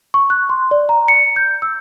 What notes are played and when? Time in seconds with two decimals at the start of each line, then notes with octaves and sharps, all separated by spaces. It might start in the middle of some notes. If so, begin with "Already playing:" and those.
0.14 C#6
0.30 F#6
0.50 C6
0.71 D5
0.89 A#5
1.08 C#7
1.36 G6
1.62 E6